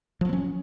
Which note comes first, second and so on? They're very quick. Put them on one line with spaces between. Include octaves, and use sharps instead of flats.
F3 F#3 B3 C#4